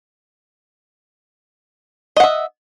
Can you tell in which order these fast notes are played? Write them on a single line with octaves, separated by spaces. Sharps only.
D#5 F#5 E5